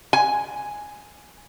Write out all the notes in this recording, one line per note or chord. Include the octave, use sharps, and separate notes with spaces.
G#5